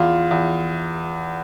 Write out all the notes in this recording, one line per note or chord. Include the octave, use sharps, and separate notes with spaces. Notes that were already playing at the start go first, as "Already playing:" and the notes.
Already playing: E2 F4
E2